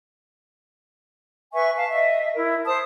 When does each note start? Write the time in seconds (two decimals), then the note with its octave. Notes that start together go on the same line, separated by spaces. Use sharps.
1.53 B4 E5 G#5 C#6
1.76 F5 A5
1.90 D#5 E5
2.36 E4 A#4
2.65 C5 A5 D#6